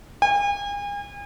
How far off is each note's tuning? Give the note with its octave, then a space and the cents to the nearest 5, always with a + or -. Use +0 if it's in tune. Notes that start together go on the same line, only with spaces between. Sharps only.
G#5 -40